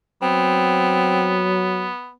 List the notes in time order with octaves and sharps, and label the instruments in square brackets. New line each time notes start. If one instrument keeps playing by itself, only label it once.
[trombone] F#3 [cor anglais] B3 [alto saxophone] C4